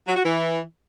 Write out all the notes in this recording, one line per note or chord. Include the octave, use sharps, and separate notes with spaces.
F#3
F#4
E3